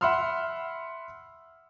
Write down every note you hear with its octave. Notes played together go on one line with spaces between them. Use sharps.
E5 F#5 B5 C6 E6 F6